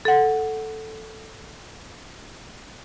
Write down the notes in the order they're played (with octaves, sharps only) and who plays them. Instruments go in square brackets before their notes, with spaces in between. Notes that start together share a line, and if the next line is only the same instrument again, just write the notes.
[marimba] A4 F#5